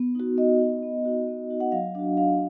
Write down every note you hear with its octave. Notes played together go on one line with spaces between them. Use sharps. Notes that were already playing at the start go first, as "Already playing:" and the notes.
Already playing: B3
D#4 F#4
B3 D#5
D#4 F#4
B3
D#4 F#4
B3
D#4 F#4
F#5
F#3 F5
D4 F#4
F#3 F5